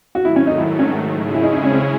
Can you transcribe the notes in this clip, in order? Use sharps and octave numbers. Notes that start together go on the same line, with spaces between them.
G#2 D#3 F#3 A3 F#4
E4
C#4
D#4
E4
C#4
C#3 G#3 C#4 E4 G#4
E4
D#4
D#4
C#4
C4
C#4